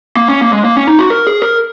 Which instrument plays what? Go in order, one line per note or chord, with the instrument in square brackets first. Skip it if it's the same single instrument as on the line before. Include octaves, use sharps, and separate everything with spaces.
[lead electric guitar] A#3
C#4
A#3
G#3
A#3
C#4
D#4
F#4
A#4
G#4
A#4